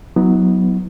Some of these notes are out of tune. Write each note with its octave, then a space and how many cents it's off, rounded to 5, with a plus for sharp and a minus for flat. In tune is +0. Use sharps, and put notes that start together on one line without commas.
F#3 +0 B3 +0 D#4 +45